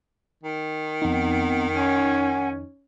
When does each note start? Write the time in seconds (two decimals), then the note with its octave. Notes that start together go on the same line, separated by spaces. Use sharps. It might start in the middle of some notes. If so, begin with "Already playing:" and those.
0.43 D#3
1.02 F2 B3 C4 D#4 F#5
1.75 C#4 F#5 G#5